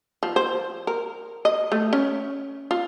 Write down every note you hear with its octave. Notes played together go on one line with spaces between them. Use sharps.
F3
C5
A#4
D#5
A3
C#4
F4